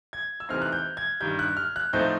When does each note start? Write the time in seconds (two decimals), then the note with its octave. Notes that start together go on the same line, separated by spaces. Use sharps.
0.13 G#6
0.40 E6
0.49 C3 E3 A3 C4 D#4 F6
0.62 F#6
0.73 G6
0.97 G#6
1.21 G2 D#3 G3 G6
1.39 F#6
1.57 F6
1.76 F#6
1.93 A2 F3 A3 C4 D#4 G6